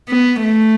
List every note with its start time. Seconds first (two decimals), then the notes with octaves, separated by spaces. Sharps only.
0.09 B3
0.42 A3